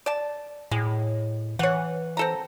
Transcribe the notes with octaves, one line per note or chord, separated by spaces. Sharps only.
D5 A5
A2 G#3
E3 C#5 F#5
C4 A4 A#5